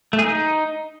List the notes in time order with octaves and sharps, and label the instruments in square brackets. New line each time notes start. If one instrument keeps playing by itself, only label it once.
[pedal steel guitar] A3
G#4
D#4